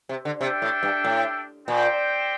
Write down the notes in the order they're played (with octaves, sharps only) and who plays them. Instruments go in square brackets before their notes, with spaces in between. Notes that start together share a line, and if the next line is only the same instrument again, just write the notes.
[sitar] C3
D3
[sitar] C3 [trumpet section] D4 A4 E5 G5
[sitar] A2
G2
A2
[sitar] A#2 [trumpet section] C4 G4 C5 G5